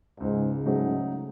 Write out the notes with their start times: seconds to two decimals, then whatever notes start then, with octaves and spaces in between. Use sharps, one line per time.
0.20 C#2 G#2
0.65 G#2 C#3 F#3 A3 D#4